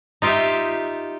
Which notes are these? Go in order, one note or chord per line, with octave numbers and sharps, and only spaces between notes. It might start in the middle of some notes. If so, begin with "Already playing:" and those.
D#4 F4 G4 D#5 E5